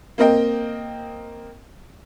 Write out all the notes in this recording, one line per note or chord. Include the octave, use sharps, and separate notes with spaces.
A#3 C4 A#4 D#5 G5